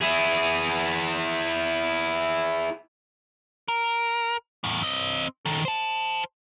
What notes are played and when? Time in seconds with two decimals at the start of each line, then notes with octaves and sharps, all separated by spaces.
0.01 E4 G#4
3.68 A#4
4.64 E2 A2
4.83 C4 D#5
5.46 D#3 A4
5.65 C5 A5